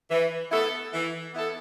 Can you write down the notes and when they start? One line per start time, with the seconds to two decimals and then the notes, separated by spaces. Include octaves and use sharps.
0.10 E3
0.52 B3 E4 A4
0.93 E3
1.34 B3 E4 A4